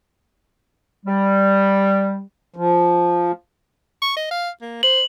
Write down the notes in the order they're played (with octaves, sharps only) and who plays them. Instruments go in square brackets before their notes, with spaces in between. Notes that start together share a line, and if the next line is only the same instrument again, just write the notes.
[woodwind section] G3
[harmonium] F3
[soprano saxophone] C#6
D#5
F5
A#3
[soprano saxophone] C5 [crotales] F#7